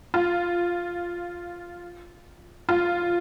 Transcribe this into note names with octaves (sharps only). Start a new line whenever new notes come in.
F4
F4